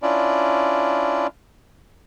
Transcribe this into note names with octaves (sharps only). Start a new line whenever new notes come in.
C#4 D4 E4 F4 D5